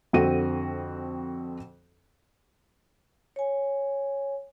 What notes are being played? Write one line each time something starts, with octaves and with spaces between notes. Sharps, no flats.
F2 D3 C4 F#4 D#7
C#5 G#5